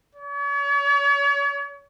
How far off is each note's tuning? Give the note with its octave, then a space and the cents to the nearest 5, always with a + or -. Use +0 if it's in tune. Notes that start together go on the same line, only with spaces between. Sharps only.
C#5 +40